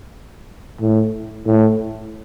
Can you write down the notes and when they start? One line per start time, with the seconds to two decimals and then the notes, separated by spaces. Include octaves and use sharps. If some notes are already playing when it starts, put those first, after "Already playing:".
0.80 A2
1.46 A2